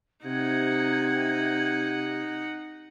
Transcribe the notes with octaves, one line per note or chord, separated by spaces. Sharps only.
C3 D#4 F#5 G#6